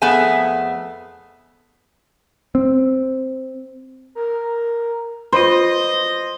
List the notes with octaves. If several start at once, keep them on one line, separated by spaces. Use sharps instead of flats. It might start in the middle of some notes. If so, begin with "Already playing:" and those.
F2 A3 B3 G#4 E5 G#5
C4
A#4
F4 C5 D#5 B5